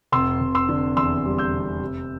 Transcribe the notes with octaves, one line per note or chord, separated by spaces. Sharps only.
F1 C6 E6
F1
C6 E6
D3
E2 C6 E6
G3
E6 G6
F1
C3